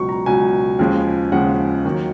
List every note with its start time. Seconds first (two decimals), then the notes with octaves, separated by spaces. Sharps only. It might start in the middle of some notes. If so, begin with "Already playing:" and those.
Already playing: C#2 B2 F#3 C#6
0.09 A#5
0.26 C#2 B2 F#3 G#5
0.79 D#2 C#3 F3 G#3
1.32 D#2 C#3 F3 G#3 F#5
1.85 D#2 D#3 F#3